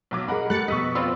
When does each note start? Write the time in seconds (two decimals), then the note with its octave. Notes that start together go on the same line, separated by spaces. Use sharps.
0.11 B1 F#3 D6
0.28 G#4 A#4 D#5 F#5 B5
0.50 A3 G4 A4 F#6 A6 C#7
0.68 F2 B2 D#5 C#6 E6 B6
0.95 C4 F4 D5 B5 E6